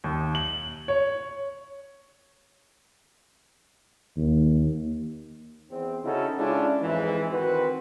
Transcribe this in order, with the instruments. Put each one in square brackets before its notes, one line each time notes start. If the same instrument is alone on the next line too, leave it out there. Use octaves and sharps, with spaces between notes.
[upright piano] D#2
F#7
C#5
[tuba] D#2
[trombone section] E2 C4
C#3 D#4 E4 F#4 A4
G#3 C#4 D4 E4 F4
F2 G#2 E3
D#3 C4 F#4 B4